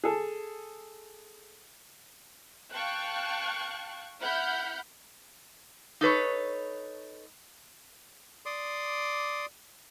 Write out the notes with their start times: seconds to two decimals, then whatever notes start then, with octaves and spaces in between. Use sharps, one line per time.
0.04 G#4 A4
2.72 F5 G5 A5 C#6 F#6
4.22 E4 F#5 B5 F6 G6
6.01 D#4 A4 B4 C#5
8.46 D5 C6 D6 D#6